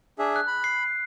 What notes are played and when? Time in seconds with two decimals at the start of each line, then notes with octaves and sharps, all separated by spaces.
0.19 D4 G#4 E5
0.36 F#6
0.47 B5
0.64 C7